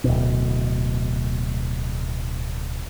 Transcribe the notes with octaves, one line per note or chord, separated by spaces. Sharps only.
D1 G#1 B2